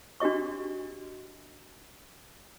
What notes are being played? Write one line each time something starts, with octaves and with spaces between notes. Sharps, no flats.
D4 F#4 G4 D#5 C#6